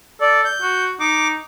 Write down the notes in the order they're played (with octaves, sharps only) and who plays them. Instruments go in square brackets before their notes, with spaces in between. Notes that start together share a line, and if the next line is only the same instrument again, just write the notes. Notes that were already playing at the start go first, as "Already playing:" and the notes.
[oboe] A4 [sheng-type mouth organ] D5
[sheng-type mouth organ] G6
[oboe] F#4
[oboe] D#4 [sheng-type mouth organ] D6